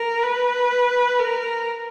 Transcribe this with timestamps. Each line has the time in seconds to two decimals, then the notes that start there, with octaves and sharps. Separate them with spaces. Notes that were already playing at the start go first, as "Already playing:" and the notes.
Already playing: A#4
0.23 B4
1.19 A#4